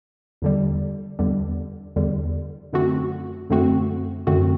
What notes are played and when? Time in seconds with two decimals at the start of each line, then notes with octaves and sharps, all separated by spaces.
0.42 E2 D3 G3
1.19 E2 D3 G3
1.96 E2 D3 G3
2.73 F#2 D3 A3 C4 F#4
3.50 F#2 D3 A3 C4 F#4
4.27 F#2 D3 A3 C4 F#4